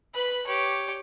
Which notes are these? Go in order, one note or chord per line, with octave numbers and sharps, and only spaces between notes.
B4 B5
G4 C#5